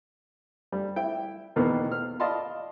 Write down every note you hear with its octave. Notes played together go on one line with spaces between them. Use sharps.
G3
E4 G5
E2 B2 D#3 A#3 B3
F6
D5 D#5 F5 A5 B5 C6